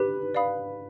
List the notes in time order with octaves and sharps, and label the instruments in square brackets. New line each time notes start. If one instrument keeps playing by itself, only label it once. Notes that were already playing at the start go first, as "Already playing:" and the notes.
Already playing: [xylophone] G4 [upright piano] B4
[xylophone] D5 F5 B5 D#6